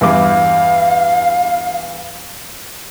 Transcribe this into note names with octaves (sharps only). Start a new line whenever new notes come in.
E2 G2 F5 D6